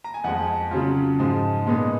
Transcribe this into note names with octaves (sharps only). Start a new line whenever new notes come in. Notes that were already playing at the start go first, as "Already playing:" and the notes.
A#5
G#5
F2 F3 G#3 F#5
C#3 F#3 C#4 F4
G#2 F3 G#3
A#2 G#3 B3 D#4